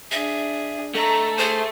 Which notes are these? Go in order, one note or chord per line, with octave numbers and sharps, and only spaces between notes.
D4 G#4 E5
A3 A4 D#5 A#5
G#4 C5 C6